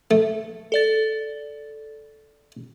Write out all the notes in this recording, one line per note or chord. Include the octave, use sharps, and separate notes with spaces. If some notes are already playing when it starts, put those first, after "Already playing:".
A3
A4 D5 A6